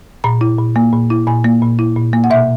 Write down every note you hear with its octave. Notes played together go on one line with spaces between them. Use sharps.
A#2 A#5
E4
A#2
A#3
A#2
E4
A#2 G#5
A#3
A#2
E4
A#2
A#3
F#5
B2 E5